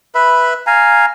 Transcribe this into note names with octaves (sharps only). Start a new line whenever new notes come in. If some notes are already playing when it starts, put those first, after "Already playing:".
B4 E5 B5
F5 G#5 A#5